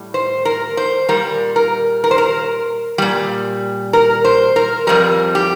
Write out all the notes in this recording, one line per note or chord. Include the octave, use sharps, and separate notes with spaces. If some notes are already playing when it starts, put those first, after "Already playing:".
Already playing: A2 G3
C5
A#4
C5
A#2 G3 A#4
A#4
A#4
C5
A#4
A#2 G3
A#4
C5
A#4
F2 D#3 G3 A#4
G4